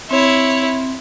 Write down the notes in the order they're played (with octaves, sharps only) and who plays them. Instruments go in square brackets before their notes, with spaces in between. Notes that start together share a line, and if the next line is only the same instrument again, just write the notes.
[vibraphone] C4 [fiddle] E4 C#5